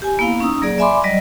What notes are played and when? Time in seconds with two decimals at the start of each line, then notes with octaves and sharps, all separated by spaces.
0.02 G4 G#5
0.19 A#3 B3 E4 F5
0.40 C#4 D#4 A#5 D#6 E6
0.62 F#3 A#3 G#4 D5
0.78 D5 E5 G#5 B5 C6 D6
1.04 F#3 G3 D5 D#5